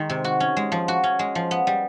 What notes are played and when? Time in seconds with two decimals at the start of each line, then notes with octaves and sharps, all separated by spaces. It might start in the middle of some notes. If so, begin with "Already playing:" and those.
Already playing: D#3 G#3
0.10 C3
0.24 F#4
0.40 C#4
0.57 G#3
0.72 F3
0.88 F#4
1.04 C#4
1.19 G#3
1.35 F3
1.51 B3
1.67 G3